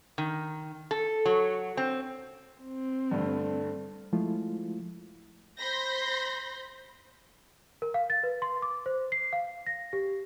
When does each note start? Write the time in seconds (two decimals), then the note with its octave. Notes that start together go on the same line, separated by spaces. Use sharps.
0.18 D#3
0.91 A4
1.26 F#3
1.77 C4
2.62 C4
3.11 G2 D3 A3
4.13 F3 G#3 A3 E4 F4
5.59 C5 B5 C6 G6 A#6
7.82 A#4
7.94 F5
8.10 A6
8.23 B4
8.42 C6
8.62 D6
8.86 C5
9.12 C7
9.33 F5
9.66 A#6
9.93 G4